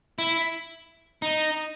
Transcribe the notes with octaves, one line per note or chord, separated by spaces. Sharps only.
E4
D#4